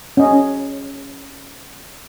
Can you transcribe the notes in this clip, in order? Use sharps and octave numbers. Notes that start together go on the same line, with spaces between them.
C#4 D#5